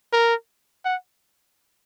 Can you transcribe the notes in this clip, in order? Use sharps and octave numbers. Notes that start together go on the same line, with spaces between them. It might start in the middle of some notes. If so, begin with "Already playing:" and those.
A#4
F#5